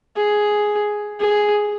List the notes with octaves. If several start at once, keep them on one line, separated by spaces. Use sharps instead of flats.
G#4
G#4